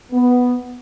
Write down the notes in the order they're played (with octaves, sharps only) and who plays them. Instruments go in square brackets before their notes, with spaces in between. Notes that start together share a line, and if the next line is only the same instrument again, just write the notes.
[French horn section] B3